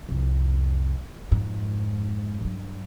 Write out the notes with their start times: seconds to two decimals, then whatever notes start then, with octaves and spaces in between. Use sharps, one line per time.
0.09 C2 F2
1.31 F2 G#2
2.41 G2 F#3